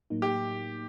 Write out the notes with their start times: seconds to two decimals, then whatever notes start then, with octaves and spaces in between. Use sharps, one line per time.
0.10 A2 F#3 A#3 D#4
0.22 G4